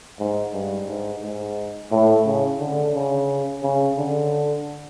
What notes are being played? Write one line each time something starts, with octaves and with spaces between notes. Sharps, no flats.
G#2
G2
G#2
G#2
A2
C#3
D3
C#3
C#3
D3